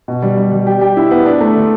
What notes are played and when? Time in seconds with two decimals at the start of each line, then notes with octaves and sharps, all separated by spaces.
0.08 B2
0.22 G3
0.37 G3
0.52 G3
0.67 G4
0.81 G4
0.97 E4
1.11 B3
1.26 D4
1.41 A3
1.56 D3